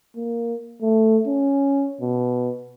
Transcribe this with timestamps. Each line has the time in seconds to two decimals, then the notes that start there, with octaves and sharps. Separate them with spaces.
0.16 A#3
0.82 A3
1.26 C#4
2.01 B2